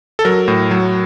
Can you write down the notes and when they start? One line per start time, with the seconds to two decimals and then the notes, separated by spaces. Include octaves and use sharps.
0.19 A4
0.25 F#3 A#4
0.48 A2
0.71 F#3